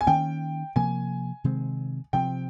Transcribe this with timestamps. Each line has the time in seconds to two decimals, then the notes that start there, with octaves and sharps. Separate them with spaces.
0.01 G#5
0.06 D#3 A#3 C#4 G5
0.76 C3 F3 A#3 G#5
1.44 C3 D#3 G#3 C4
2.13 C3 F3 C4 G5